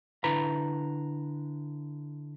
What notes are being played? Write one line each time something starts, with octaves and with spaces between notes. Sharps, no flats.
D3 E4 B4 A#5 B5